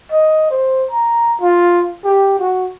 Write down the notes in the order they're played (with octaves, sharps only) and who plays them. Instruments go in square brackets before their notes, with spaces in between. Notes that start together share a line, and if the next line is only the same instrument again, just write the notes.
[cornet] D#5
C5
A#5
F4
G4
F#4